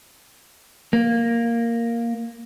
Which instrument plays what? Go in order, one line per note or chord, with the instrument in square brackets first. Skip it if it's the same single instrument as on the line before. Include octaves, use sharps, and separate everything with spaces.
[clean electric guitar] A#3